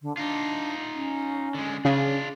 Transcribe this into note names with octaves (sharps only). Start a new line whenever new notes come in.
D3
D4 D#4 F4
C#4
D3 G#3
C#3 D4 F4